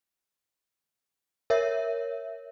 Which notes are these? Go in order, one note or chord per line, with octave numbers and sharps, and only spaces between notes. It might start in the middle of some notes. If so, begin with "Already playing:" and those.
A#4 C#5 E5